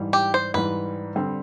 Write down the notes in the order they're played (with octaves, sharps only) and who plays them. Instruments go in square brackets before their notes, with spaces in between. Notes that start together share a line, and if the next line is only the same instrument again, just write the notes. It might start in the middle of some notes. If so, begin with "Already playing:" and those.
Already playing: [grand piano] G#2 E3 G3
[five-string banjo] G4
C5
[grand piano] G#2 E3 G3 [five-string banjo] B4
[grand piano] D3 G3 C4